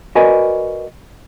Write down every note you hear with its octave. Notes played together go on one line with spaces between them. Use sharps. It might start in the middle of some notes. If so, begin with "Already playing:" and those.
F#4 A#4 B4 D5 D#5 G#5